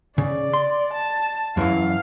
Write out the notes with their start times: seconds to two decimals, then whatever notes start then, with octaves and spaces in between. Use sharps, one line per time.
0.18 C#3 D5
0.53 C6
0.93 A5
1.57 F#2 E3 F#3 F5